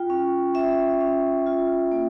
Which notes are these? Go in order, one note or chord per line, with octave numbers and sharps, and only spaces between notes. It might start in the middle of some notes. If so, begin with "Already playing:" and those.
Already playing: F4 G5
C#4
C#4 E5
C#4
F4
A#3